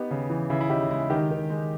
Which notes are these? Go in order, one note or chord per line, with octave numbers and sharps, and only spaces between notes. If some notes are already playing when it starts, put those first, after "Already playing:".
Already playing: B3 D#4 G4
C#3
E3
C#3 E4
E4
C#3 D#4 G4
G#3 E4
D#3 D#4 G4
D#3
G#3